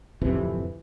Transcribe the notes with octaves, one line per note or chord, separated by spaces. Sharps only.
D1 F2 C3 E3